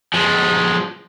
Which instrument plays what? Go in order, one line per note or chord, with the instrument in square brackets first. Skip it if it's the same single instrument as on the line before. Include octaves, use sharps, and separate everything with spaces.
[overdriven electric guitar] F3 G#3